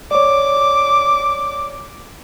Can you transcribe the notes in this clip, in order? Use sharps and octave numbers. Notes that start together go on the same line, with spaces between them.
C#5 D5 D6